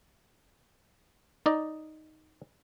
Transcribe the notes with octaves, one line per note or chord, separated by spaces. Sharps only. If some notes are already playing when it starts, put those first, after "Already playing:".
D#4 D5 D#5